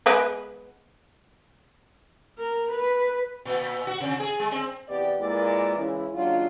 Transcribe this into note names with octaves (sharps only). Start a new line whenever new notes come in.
G#3 B3 B4
A#4
B4
A#2
F#4
C3
G#4
G#3
C4
E2 C3 B3 G4 D5
A#2 G#3 E4 A#4 B4 D5
C#3 E3 G#3 E4
D#2 C#3 F#3 D4 F4